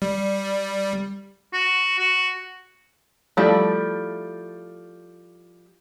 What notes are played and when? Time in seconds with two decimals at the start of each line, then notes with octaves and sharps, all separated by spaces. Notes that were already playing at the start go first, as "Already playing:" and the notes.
0.02 G3
1.53 F#4
1.99 F#4
3.37 F3 G3 A3 E4